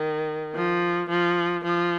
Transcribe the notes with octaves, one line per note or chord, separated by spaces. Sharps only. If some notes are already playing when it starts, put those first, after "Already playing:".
Already playing: D#3
F3
F3
F3